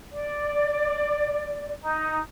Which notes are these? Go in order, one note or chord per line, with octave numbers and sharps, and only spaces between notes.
D5
D#4